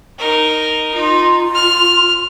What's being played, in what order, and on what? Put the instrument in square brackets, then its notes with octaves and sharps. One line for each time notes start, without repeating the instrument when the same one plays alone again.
[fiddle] D#4 A#4
[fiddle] D#4 [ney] F4
[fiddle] F6